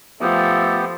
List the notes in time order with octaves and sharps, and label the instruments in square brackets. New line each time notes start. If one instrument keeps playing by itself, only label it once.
[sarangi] F3 [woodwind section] A3 A4 [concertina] B3 G4